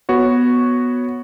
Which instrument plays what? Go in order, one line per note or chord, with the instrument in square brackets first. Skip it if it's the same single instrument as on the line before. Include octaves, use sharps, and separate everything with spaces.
[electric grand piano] B3 F#4 C#5